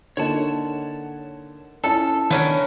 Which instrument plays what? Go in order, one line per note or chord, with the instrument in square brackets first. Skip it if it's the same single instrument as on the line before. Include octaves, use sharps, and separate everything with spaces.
[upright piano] D3 A#3 D#4 [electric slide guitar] C#5 F#5 A5
[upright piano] C#4 E4 A5 [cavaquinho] A4
[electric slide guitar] D#3 [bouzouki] B3 C#4 A#4 [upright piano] D4